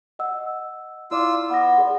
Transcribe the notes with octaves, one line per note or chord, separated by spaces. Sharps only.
D#5 F#5 E6
E4 F4 D5 D6 E6
B3 B5 A#6
G#4 D5